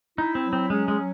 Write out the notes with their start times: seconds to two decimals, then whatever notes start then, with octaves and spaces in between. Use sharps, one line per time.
0.18 D#4 E4
0.35 C4
0.45 F#3
0.53 C4
0.70 G#3 C#4
0.88 G#3
0.96 F#3